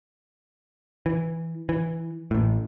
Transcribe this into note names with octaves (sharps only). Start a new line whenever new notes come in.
E3
E3
A1 A2